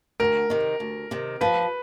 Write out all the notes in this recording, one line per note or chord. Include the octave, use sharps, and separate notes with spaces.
D2 A#4
C3 D#3
D2
C3 D#3
F3 B4